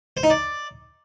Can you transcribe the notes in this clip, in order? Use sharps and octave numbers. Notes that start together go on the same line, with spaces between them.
C5
D#4
D5